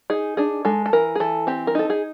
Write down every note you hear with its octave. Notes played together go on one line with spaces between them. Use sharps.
D#4 G#4
D4 G#4
G#3 A4
A4
E3 A#4
G#4
E3 A4
C4 G4
A#4
D#4 A4
G#4